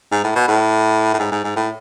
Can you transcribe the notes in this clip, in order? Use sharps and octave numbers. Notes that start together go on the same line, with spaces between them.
G#2
A2
B2
A2
A2
G#2
G#2
G#2
A2